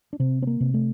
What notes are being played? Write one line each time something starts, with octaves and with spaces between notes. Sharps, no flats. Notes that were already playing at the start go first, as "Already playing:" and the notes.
D4
C3 C4
C4
A#3
C3
A3